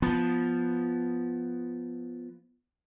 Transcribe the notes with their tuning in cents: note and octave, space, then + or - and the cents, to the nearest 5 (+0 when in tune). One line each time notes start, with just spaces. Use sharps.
F3 +0 B3 +0